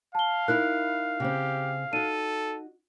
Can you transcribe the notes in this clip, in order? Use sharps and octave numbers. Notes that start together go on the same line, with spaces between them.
F5 A5 G7
D#4 E4 A#4 F#6
C#3 C4 G4
D#4 F#4 A4 D#7